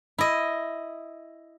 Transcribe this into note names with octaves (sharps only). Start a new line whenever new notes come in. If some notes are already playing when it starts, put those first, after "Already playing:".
E4 D#5